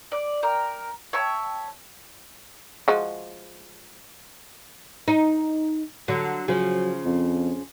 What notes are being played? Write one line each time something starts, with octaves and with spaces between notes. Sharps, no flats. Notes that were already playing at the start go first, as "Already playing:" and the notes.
D5
A#4 G5
C#5 E5 G5 A5
F3 G#3 F#4
D#4
D3 F#3
C#3 F3 F#3
F2